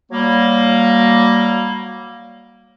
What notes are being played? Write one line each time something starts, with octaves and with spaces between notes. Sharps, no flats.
F#3 G3 A#3